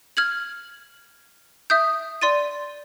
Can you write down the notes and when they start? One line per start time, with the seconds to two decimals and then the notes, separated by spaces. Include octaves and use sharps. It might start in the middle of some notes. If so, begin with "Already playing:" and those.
0.17 F6 G#6 F#7
1.70 E5 D#6 G6
2.21 D5 C6 A6 D#7